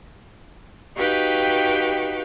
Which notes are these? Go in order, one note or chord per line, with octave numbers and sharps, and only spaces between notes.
D#4 F#4 G4 B4 F5 G5